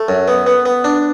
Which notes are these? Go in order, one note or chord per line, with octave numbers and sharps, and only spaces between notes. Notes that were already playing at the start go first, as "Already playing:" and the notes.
Already playing: A3
F#2
B3
B3
B3
D4